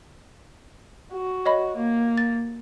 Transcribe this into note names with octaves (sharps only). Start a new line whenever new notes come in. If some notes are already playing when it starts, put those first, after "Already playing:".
F#4
C#5 D#5 B5
A#3
A6